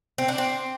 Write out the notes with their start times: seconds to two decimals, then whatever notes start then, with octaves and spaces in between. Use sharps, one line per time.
0.18 C4
0.28 D4
0.38 C4